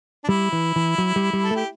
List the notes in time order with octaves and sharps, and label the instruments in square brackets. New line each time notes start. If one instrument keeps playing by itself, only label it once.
[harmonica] D4
[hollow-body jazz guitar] G3 [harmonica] E4
[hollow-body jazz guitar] E3
E3
F#3
G3
G3
[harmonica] A4
[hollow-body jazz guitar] A3 [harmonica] G4